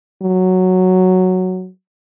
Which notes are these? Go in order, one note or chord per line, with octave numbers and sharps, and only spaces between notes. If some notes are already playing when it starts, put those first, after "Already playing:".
F#3